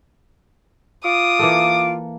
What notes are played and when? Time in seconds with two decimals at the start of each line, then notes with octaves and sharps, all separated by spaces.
1.05 F4 D6 D#6
1.39 E3 A#3 A4